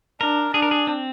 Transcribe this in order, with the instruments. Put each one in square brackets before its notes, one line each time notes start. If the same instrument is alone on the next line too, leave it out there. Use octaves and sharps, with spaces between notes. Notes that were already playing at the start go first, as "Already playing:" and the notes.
[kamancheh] D4 [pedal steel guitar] A#4
[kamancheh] D4 [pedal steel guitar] G#4
[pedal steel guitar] A#4
G#4
C4